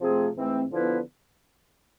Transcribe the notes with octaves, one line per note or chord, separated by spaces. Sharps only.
C3 F3 A3 C4 G#4
G#2 E3 A3 C4
D3 F3 B3 E4 B4